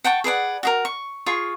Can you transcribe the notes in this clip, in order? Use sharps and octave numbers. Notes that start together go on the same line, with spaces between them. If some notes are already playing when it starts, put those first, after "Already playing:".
F#5 G5 A5 C#6
G#4 B4 D5 F#5
F#4 G#4 A#4
C#6
F4 G#4 C#6